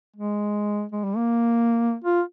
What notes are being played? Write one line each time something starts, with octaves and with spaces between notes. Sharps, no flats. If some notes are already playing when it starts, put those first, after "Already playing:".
G#3
G#3
G3
A#3
F4